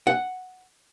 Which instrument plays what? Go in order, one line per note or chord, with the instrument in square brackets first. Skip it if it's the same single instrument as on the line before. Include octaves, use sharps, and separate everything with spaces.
[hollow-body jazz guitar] F#5